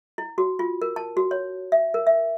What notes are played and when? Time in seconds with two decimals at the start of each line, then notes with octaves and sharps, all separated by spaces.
0.18 E4
0.38 F#4
0.59 F4
0.82 A#4
0.96 A5
1.17 F#4
1.31 C#5
1.72 E5
1.94 A#4
2.07 E5